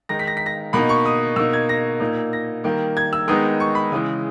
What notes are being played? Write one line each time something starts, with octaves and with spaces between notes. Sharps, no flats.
D#3 G#3 D#4 A#6
B6
A#6
B6
A#6
B2 A#3 D#4 B5
C#6
D#6
B2 A#3 D#4 E6
G#6
A#6
A#2 A#3 D#4
A#6
D#3 G3 A#3
G#6
E6
D#3 G#3 B3 D#4 D#6
C#6
B5
C#3 E3 G#3 D#6